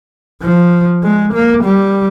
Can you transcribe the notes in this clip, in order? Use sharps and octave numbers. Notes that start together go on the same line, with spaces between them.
F3
G#3
A#3
G3